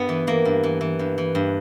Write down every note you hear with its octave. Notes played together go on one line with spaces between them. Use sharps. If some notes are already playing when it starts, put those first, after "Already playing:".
Already playing: G2 B3 G4
E3
E3 A#3
G2
E3
E3
G2
E3
G2